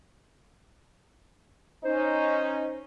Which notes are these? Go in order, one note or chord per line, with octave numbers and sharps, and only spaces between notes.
C#4 D#4 C5